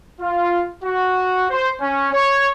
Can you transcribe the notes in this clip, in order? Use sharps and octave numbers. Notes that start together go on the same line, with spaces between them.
F4
F#4
C5
C#4
C#5